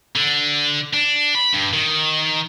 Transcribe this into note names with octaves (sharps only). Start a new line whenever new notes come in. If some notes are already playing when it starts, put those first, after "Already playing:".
D3
D4
B5
G2
D#3